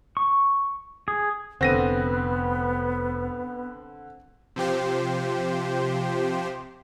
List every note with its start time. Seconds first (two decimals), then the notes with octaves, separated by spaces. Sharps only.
0.17 C#6
1.08 G#4
1.61 F1 D3 B3 C4 A#6 D#7
4.56 C3 F3 G4 C5